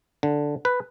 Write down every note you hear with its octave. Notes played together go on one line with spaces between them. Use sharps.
D3
B4